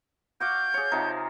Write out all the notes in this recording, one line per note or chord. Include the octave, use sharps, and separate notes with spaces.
F#4 D5 F5 G6
G#4 C#5
C3 F3 D#4